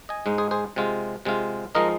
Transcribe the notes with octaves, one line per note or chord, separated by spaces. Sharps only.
D#5 G#5
G#2 G#3 D#4
G#4 C5
G#4 C5
C3 G#3 F4
C3 G#3 F4
F3 G#3 D#4 A#4 D#5